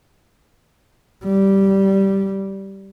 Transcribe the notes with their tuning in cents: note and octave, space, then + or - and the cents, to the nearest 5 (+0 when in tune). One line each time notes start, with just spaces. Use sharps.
G3 -10